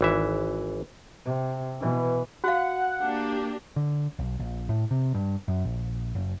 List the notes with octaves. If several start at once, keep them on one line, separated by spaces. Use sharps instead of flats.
G#1 E3 E5
C3
B2 E3
F#4 F5 F#5
A#3 D4 G4
D3
B1
A#1
A2
C3
G2
F#2
A#1
F#1